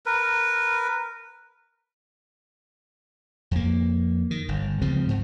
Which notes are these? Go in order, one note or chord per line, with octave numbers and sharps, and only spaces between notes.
A#4 B4
F2 A#3
D#3
G1
C#2 C#3 F3 C4
G#2